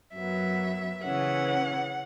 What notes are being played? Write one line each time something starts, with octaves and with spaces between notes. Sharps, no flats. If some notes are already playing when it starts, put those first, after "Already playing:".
F#2 F#3 B3 E5
C#3 E3 C#4 F#5